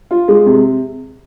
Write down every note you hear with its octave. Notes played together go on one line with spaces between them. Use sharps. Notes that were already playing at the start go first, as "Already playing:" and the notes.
F4
G#3
C3